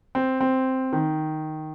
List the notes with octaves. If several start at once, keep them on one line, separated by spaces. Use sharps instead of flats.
C4
C4
D#3